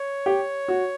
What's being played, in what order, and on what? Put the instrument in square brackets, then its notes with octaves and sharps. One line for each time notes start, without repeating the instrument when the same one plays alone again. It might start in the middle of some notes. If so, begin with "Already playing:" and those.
Already playing: [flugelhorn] C#5
[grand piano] G4
F#4